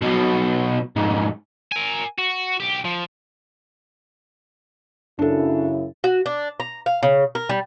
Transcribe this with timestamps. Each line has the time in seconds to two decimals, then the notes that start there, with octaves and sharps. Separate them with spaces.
0.02 B1 B2
0.96 F2 G#2
1.72 A#4 G#5
2.19 F#4
2.60 B1 G4
2.85 F3
5.19 F#2 C#3 D4 E4 A4
6.04 F#4
6.26 D4
6.60 A#5
6.86 F5
7.03 C#3
7.35 A#4
7.49 G3